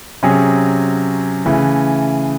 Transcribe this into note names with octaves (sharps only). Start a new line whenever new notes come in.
C3 F#3 C#4 G#4
C#3 E3 A3